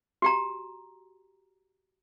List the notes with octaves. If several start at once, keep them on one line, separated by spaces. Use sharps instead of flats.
F#4 G4 A#5